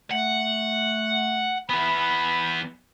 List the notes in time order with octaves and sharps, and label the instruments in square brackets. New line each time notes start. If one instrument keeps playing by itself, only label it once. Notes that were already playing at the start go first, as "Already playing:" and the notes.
[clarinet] A3 [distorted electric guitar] F#5
[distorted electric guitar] E3 B3 [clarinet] B5